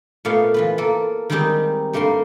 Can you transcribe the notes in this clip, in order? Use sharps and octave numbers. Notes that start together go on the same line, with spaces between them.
A#2 A3 B3 F5
E3 F4 B4
A#3 A4
D#3 G3 G#3 C4 D#4 G4
G2 A3 A#3 A#5 C6